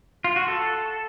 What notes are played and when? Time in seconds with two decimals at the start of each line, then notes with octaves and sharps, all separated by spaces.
0.24 F4
0.36 F#4
0.48 A4